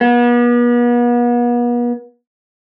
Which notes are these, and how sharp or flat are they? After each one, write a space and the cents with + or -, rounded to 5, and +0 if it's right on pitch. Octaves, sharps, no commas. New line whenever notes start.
B3 -40